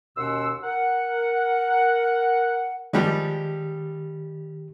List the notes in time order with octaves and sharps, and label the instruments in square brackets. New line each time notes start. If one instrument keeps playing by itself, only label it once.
[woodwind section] D#2 B2 C#4 F#5 C6 E6
A#4 F#5
[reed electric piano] D#3 G4 [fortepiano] F3 G3 G#3